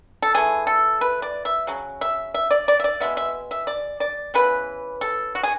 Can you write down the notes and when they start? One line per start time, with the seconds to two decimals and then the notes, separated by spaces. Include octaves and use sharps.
0.22 A4
0.34 E3 A3 G#4
0.67 A4
1.01 B4
1.22 D5
1.45 E5
1.67 C#3 F#3
2.01 E5
2.34 E5
2.51 D5
2.68 D5
2.80 E5
2.84 D5
3.00 B2 G#3 B3 E5
3.17 E5
3.51 E5
3.67 D5
4.00 D5
4.34 C#3 E3 B3 B4
5.01 A4
5.35 F#4
5.43 G#4